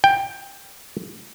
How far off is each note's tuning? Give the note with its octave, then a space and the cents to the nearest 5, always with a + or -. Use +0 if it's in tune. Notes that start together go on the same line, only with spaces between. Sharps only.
G5 +15